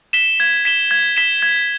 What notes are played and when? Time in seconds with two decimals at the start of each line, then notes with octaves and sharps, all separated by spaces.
0.13 B6 E7 G7
0.40 G#6
0.65 B6 E7 G7
0.91 G#6
1.17 B6 E7 G7
1.42 G#6